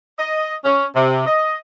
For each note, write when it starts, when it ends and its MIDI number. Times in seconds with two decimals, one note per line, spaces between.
0.19 0.55 75
0.64 0.85 61
0.95 1.22 48
1.27 1.57 75